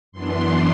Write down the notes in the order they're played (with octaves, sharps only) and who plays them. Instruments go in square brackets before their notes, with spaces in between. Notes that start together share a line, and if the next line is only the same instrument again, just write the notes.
[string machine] F#2 E3 B3 D4 C6